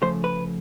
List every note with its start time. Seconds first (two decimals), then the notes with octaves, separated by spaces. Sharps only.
0.02 C#3 F3 A3 C5
0.24 B4